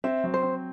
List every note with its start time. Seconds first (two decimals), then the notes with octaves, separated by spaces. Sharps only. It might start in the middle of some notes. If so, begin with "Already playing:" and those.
0.04 C4 E5
0.24 F#3
0.34 C5
0.43 C4